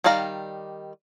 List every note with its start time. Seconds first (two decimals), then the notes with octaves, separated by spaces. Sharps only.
0.04 D#3 G3 D5 F5 A#5